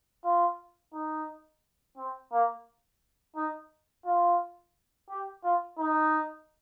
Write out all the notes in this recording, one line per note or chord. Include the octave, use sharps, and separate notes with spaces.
F4
D#4
C4
A#3
D#4
F4
G4
F4
D#4